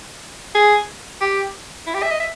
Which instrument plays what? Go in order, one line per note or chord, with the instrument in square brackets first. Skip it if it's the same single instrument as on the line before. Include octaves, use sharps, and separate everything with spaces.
[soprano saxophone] G#4
G4
E4
G4
E5
D#5
E5